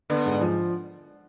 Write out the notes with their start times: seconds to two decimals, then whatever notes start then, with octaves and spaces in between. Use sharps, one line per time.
0.10 D3 B3
0.26 G#2
0.41 F3